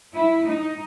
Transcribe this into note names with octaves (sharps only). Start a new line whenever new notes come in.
E4
D#4